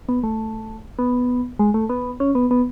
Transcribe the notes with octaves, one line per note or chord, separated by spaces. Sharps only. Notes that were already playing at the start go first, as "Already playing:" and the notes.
B3
A3
B3
G#3
A3
B3
C#4
B3
B3